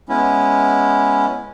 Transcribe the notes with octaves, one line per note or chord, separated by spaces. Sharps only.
G#3 B3 C#4 E4